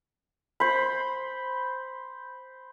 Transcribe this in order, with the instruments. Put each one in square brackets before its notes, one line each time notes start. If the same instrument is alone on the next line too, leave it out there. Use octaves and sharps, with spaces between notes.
[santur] C5 B5